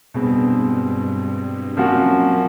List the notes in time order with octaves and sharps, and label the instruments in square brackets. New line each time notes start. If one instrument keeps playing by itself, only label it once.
[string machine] G2 [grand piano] B2 G#3 C4
[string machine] F#2 [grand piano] C3 F3 A#3 C#4 F#4
[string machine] A#2